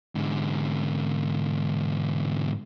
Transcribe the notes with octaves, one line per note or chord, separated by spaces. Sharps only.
G#2 D3